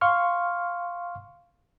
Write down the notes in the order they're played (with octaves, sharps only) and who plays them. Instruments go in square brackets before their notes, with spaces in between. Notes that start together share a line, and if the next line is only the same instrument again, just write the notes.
[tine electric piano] F5 C6 C#6 F6